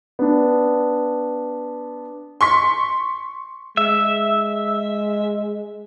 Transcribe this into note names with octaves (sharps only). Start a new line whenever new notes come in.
B3 D4
C6 C#6 B6
G#3 E5